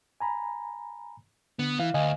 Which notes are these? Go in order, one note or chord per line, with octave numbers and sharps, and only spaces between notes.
G#5 A#5 B5
D3 B3
E3 F5
D2 D#5 F5 G#5